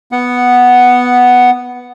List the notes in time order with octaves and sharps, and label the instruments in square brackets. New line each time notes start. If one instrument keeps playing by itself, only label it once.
[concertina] B3 F#5